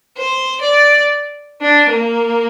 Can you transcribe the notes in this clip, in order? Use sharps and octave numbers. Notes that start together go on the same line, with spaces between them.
C5
D5
D4
A#3